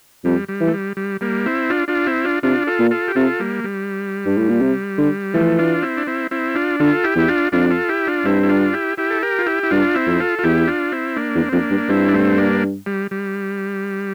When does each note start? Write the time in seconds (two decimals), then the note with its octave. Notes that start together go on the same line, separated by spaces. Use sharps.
0.24 F2 G3
0.48 G3
0.60 E3
0.67 A3
0.73 G3
0.97 G3
1.21 G3 A#3
1.46 C4 E4
1.70 D4 F4
1.88 D4 F4
2.07 C4 E4
2.24 D4 F4
2.43 C3 D4 F4
2.67 F4 A4
2.79 A#2
2.91 F4 A4
3.08 G4
3.16 C3 F4 A4
3.40 G3 A#3
3.64 G3
4.25 G2
4.37 A2
4.49 A#2
4.62 C3
4.98 D3
5.34 E3 F3 A3
5.59 D4 F4
5.82 C4 E4
5.97 D4
6.07 C4 E4
6.31 C4 E4
6.55 D4 F4
6.80 D3 F4 A4
7.04 E4 G4
7.16 E2 E4
7.28 D4 F4
7.52 F2 D4 F4
7.70 F4 A4
7.89 E4 G4
8.07 D4 F4
8.25 G2 C4 E4
8.43 E4
8.49 D4 F4
8.73 E4 G4
8.98 E4 G4
9.10 A4
9.22 G4 A#4
9.39 F4
9.46 E4 G4
9.63 E4
9.71 G2 D4 F4
9.95 C4 E4
10.07 F2
10.20 F4 A4
10.39 F4
10.43 E2 E4 G4
10.67 D4 F4
10.92 C4 E4
11.16 A#3 D4
11.35 E2
11.49 C4
11.52 F2 A#3 D4
11.71 G2
11.89 G2 C4 E4
12.08 D4
12.13 A3 C4
12.38 A#3 D4
12.86 G3
13.11 G3